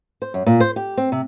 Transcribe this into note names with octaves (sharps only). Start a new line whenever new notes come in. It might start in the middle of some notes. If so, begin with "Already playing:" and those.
C5
F#2
A#2
C5
G4
C4
C3